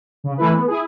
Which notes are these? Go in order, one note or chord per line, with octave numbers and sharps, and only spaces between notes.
C#3
E3 A3 E4 B4
B3
E4 G#4